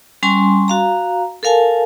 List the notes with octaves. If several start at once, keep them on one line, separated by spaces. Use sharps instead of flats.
G3 C#4 G#5 C6
F#4 F5 A#5
A4 A#4 F5 G#5 A5